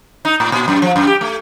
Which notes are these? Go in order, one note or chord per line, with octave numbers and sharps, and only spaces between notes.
D#4
A2
A#2
F#2
F3
F#2
G4
A3